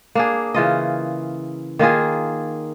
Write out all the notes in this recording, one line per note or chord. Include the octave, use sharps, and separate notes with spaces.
A#3 D4 G#4
C#3 E3 F4 D#5
D#3 A#3 F4 G#4